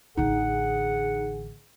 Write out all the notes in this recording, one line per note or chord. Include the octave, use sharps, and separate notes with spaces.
A1 D3 D#4 G#4 F#5